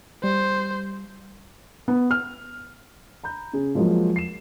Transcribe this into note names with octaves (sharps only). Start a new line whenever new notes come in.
G3 C5
B3
F6
A#5 B5 G6
C#3 G#4
F3 F#3 G#3 A#3 F4
C7 E7